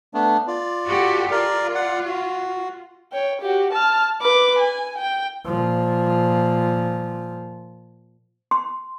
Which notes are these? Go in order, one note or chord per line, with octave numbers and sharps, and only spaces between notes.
A3 B3 D4
F4 D5
F#4 G4 A4
F4 A#4 D5
D5 F#5
F#4
C#5 G5
F#4 G4
A5 F6
B4 D6
G#5
G5
A#2 F3
C6